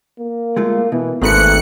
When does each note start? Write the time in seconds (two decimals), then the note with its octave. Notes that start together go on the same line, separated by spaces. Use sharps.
0.19 A#3
0.56 G#3 A3 F4
0.92 B2 E3
1.22 G#1 A3 A#3 C4 B4 F#6 C#7